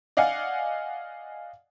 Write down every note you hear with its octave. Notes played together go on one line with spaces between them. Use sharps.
D5 D#5 F5 F#5 G#5